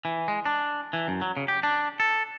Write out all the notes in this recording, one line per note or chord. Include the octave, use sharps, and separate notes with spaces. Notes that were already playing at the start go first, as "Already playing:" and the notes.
E3
G#3
D4
E3
F#2
F#3
C#3
G4
D4
A4